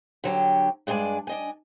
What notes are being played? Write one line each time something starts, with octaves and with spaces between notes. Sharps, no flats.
D3 F#3 G4
G2 G#3 D4 D5 G#5
D4 D#5 G#5